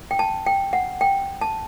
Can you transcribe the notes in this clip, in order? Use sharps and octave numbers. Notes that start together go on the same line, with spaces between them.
G5
A5
G5
F#5
G5
A5